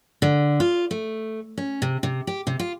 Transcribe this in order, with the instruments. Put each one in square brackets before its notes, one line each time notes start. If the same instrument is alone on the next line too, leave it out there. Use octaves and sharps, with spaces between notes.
[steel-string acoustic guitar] D3
F4
A3
C#4
C3
C3
G4
C3
F4